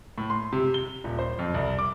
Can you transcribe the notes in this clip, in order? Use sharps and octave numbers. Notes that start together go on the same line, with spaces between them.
A2
C6
C3
G7
D#1
C5
F2
C2
D6